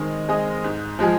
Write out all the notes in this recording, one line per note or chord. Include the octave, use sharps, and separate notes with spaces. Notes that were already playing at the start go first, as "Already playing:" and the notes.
Already playing: D#3 G#3 C4 G#4 D#5
G#3 C4 G#4 D#5
G#2
F3 G#3 F4 G#4